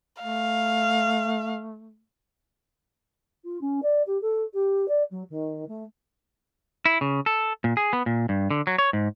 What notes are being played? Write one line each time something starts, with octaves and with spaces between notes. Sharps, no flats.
A3 F5
F4
C#4
D5
G4
A4
G4
D5
F#3
D#3
A3
E4
C#3
A4
A#2
G#4
B3
A#2
G2
D3
F#3
C#5
G#2